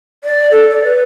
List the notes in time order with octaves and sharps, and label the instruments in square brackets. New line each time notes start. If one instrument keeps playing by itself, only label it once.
[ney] D5
A4
D5
B4